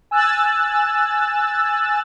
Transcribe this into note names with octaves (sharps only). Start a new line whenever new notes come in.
G#5 E6 F#6 A6